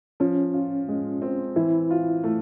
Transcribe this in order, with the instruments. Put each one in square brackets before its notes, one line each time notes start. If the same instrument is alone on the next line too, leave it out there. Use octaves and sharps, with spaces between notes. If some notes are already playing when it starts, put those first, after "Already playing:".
[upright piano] F3 [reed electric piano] C#4
[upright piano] F4
G#3
C4
[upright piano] E3 [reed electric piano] E4
[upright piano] F4
A3